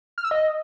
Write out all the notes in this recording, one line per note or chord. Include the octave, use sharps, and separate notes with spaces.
F6
E6
D#5